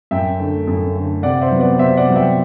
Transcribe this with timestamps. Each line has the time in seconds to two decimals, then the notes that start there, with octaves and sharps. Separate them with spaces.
0.11 F#2 E5 G5
0.39 D3 A3
0.67 F#2
0.96 D3 A3
1.23 C3 D5 F#5
1.42 C5 E5
1.51 F#3 B3
1.60 D5 F#5
1.78 C3 C5 E5
1.97 D5 F#5
2.07 F#3 B3
2.16 E5 G5